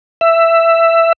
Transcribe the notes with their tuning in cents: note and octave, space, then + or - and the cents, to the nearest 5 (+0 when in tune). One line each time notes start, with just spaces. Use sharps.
E5 +10